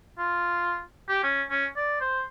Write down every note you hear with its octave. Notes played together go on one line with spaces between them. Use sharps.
F4
G4
C#4
C#4
D5
C5